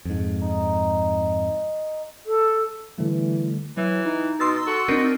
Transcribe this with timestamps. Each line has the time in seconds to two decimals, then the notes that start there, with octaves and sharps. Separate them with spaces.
0.05 F2 G#2
0.42 D#4
2.26 A4
2.98 D3 E3 G3 A3
3.77 E3 F#3
4.06 D#4
4.40 B2 C6 E6 A6
4.67 F#4 A4
4.88 C4 D4 D#4 A#4